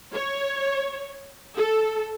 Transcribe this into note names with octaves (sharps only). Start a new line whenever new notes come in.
C#5
A4